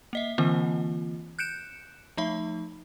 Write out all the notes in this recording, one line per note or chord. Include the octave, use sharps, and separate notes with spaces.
A#3 D#5 E5
D3 E3 A#3 C4 F4 D#5
F#6 G6 C#7 D7 E7
F3 A3 D#4 E5 B5